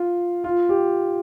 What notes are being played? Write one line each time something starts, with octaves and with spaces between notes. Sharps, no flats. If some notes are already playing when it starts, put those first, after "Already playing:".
Already playing: F4
F4
G4